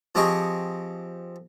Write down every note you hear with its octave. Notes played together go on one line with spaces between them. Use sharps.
F3 C4 G4 G#4 D#5 C#6